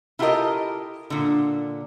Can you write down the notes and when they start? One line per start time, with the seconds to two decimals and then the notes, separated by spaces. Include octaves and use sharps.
0.19 E4 F4 G4 A4 A#4 D#5
1.10 A#2 D3